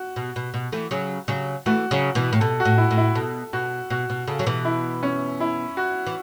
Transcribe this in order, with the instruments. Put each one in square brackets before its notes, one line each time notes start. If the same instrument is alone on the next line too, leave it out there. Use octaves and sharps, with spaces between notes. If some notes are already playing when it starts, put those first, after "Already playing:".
Already playing: [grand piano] F#4
[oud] B2
B2
B2
E3 A3
C#3 F#3
C#3 F#3
[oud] E3 A3 [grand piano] F#4
[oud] C#3 F#3
B2 E3
A2
[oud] B2 [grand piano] A4
[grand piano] F#4
[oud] A2
[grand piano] E4
[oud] A2
[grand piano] E4
[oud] B2 [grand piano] A4
[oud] B2 [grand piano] F#4
[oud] B2 [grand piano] F#4
[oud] B2
[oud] C#3 [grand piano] A4
[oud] F#3
B2 E3
[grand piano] E4
C#4
E4
F#4
[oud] E3